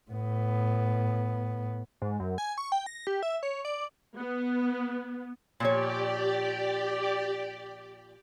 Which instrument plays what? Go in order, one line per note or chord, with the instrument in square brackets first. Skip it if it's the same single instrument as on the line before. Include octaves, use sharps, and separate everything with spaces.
[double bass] A2 B3
[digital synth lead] G#2
F#2
G#5
C#6
G5
A#6
G4
E5
C#5
D5
[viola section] B3
[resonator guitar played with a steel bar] A#2 F3 C#5 [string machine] G4 D5